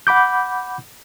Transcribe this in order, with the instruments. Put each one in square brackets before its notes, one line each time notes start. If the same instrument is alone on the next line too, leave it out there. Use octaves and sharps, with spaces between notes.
[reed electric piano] F#5 B5 D6 G6